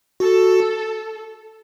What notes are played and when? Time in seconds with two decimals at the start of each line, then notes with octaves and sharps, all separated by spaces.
0.20 F#4 A4